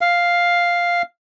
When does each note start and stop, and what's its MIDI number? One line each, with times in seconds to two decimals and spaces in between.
0.01 1.02 77